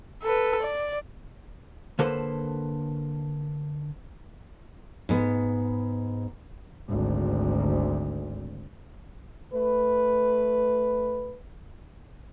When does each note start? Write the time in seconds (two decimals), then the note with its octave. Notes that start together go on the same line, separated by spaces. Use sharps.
0.23 A4 B4
0.63 D5
1.99 D3 A#3 A4 B4 C5
5.09 G#2 B3
6.89 G#1 D2
9.53 A3 B4